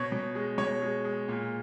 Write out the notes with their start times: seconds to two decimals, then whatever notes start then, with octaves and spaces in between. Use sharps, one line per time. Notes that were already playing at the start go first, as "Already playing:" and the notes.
Already playing: B2 C#5
0.12 B2
0.35 G#3
0.58 B2 C#5
0.82 G#3
1.05 G#3
1.28 A#2